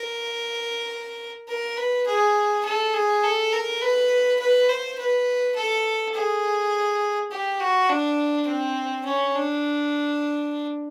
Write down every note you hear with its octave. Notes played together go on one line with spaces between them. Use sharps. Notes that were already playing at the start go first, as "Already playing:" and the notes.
Already playing: A#4
A#4
B4
G#4
A4
G#4
A4
A#4
B4
B4
C5
B4
A4
G#4
G4
F#4
D4
C4
C#4
D4